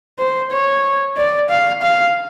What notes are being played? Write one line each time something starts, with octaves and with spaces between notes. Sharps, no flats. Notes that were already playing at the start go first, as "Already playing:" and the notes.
C5
C#5
D5
F5
F5